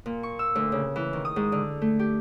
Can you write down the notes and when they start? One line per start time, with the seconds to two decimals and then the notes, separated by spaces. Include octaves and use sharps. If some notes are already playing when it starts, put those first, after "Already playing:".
0.06 A#2
0.23 C#6
0.39 E6
0.55 D2
0.72 C#3
0.96 E3
1.13 D#3
1.25 D#6
1.36 G#2
1.52 D3
1.82 A3
1.99 G4